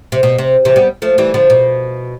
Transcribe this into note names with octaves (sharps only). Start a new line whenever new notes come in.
C3
B2
C3
C3 E3
G3 B3
F3 A3
E3 G3
D3 F3
B2